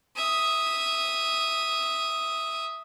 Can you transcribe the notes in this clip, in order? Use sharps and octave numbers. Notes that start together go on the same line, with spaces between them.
E5 D#6